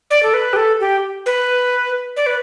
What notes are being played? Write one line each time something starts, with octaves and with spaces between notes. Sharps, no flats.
D5
A4
B4
G4
A4
G4
B4
D5
B4